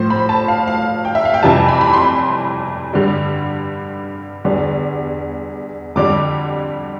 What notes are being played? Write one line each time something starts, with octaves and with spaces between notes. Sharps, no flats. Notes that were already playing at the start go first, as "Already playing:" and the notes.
Already playing: A2 F3 C5
B5
A5
F5
F5
G5
E5
F5
G5
F2 C3 E3 G3 A5
B5
B5
C6
G2 D3 G3
E2 D3 G3
F2 D3 G3 D6